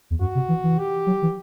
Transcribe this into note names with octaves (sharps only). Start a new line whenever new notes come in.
E2
F#2 F#4
C3
E3
E3
G4
F#3
E3